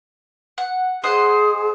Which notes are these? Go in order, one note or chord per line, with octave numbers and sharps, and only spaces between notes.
F#5
G#4 C5 D#5 F#5